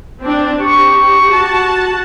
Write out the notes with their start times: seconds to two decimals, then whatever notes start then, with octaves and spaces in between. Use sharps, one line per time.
0.21 C4 D4
0.61 G4 C#6
1.32 F#4 A5